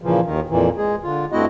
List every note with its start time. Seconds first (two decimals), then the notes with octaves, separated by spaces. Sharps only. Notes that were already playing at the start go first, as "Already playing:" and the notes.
0.02 A#2 C#3 E3 F3
0.25 D#2 D#3
0.49 F2 A#2 E3
0.77 G#3 G#4
1.03 D3 F4
1.32 G2 A3 C4 E4 F#4 D#5